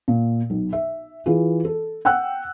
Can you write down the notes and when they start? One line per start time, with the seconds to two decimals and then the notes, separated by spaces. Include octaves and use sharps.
0.08 A#2
0.50 B1
0.73 E5
1.26 E3 F4 G#4
1.65 A4
2.05 F#5 G5 E6 F#6